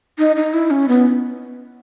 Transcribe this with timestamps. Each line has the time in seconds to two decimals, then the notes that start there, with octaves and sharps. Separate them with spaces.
0.19 D#4
0.36 D#4
0.53 E4
0.71 C#4
0.88 B3